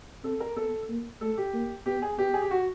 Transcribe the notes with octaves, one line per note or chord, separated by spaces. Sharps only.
C4 A4
A#4
B3 A4
A#3
A3 A4
G4
A#3
B3 G4
G#4
B3 G4
G#4
G4
F#4